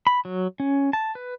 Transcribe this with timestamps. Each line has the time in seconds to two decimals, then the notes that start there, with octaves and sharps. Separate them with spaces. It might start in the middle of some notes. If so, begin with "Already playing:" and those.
0.07 B5
0.25 F#3
0.60 C#4
0.93 A5
1.15 B4